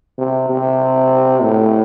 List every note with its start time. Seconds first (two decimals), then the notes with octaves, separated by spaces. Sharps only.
0.18 C3
0.50 C3
1.42 A2